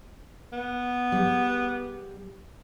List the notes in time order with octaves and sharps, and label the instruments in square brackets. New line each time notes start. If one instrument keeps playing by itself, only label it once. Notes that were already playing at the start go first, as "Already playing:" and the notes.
[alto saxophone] B3
[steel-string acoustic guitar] G3 G#4